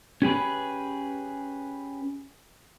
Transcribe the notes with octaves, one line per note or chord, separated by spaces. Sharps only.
C#4 G4 G#4 B4